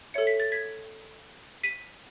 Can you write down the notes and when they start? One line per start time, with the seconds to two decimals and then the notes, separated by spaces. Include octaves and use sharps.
0.14 A4 C#5 E5 C#7
0.27 B6
0.40 A6
0.52 G#6 B6
1.63 B6 D#7